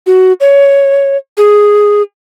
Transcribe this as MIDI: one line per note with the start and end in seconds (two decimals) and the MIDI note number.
0.07 0.33 66
0.41 1.17 73
1.37 2.02 68